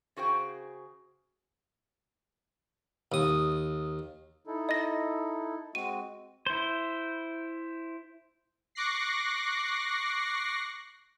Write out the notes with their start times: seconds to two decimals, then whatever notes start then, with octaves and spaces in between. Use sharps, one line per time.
0.17 C#3 F#4 G#4 C5 G5
3.12 D#2 D#6
4.47 D#4 E4 A4
4.69 D#5 A#6
5.75 G#3 C4 F#4 D#7
6.46 E4 C5
8.75 C#6 D6 F#6 A#6 C7